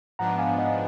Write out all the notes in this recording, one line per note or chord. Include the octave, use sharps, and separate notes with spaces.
G#2 F3 B3 D4 F#5 A#5
F5 G#5
D#5 F#5